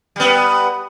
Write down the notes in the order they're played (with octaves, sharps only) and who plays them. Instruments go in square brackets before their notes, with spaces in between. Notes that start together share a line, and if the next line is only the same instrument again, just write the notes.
[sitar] G3 B3